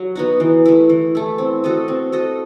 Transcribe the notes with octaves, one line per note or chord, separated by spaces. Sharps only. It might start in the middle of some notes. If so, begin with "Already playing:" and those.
Already playing: F#3
B3 D#4 F#4
E3
A3 E4
E3
A3 E4
C4
F#4 A4 D#5
C4
F#4 A4 D#5